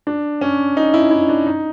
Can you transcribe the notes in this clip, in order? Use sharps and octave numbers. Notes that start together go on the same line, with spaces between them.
D4
C#4
D#4
E4
E4
D4
D#4